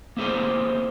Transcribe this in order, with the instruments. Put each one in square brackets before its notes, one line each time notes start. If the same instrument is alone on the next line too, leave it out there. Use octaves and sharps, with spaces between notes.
[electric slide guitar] A#3 C4 E4 G#4 A4 C5